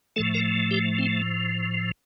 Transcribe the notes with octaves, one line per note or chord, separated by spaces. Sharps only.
A2 F3 A3 A4
A#4
G4
C4